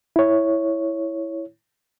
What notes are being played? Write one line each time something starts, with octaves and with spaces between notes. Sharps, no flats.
E4 C#5